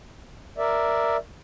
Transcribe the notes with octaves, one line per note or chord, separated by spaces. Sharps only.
A#4 D5 E5